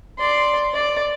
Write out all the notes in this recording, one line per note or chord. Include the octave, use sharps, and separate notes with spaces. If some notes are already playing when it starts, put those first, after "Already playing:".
D5 C6
D5